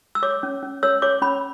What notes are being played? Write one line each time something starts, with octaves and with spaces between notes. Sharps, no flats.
E6
C#5 D6
C#4
C#4
C#5 E6
C#5 D6
C#4 B5